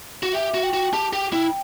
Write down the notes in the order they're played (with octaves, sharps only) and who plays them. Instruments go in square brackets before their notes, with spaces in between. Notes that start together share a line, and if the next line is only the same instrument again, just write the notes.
[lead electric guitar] F#4
[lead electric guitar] G4 [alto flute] E5
[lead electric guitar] F#4
[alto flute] G5
[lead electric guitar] F#4
[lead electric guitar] G4 [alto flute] A5
[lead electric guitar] G4 [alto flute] G5
[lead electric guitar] E4 [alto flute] G5